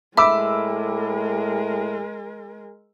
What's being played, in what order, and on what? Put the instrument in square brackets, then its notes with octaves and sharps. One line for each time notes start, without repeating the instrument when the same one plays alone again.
[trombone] A2 [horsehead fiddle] G#3 A#4 [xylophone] E5 [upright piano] B5 D6 E6